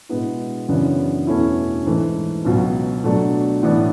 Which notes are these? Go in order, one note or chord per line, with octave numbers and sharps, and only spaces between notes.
B2 G#3 B3 E4
F#2 C#3 E3 B3 D4
E2 B2 A3 C#4 E4
G#2 E3 A3
C#2 B2 F#3
B2 F#3 A3 D4
A2 E3 B3 D4